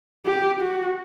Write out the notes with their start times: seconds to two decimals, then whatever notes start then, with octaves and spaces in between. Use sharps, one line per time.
0.26 G4
0.61 F#4